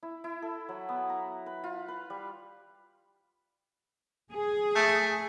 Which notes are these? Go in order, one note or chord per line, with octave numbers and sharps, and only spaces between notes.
E4
E4
A4
F#3
B3
A#5
B4
F4
B4
G3
G#4
A3